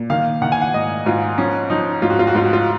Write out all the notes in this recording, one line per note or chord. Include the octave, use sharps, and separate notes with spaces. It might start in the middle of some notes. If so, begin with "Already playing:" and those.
Already playing: A#2
D#3 F5
D#3 F#5
G#5
F#5
G#2 D#5
G#2 F4
F3 C#4
F3 D#4
G#2 F4
F#4
F4
F#4
G#2 F4
F#4
F4